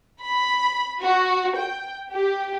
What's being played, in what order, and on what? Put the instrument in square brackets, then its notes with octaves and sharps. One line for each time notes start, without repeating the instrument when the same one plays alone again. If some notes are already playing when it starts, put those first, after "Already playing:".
[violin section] B5
F#4
G5
G4